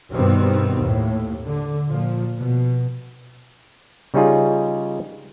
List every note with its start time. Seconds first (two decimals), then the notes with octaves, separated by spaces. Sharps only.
0.11 G2 B2 D#3 G3 B3 C4
0.81 D#2 A2
1.44 D3
1.88 A#2 F3
2.39 B2
4.14 C#3 G3 C#4 D#4 F4 G#4